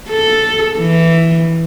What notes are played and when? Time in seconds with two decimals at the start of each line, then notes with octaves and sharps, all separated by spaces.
0.10 A4
0.78 E3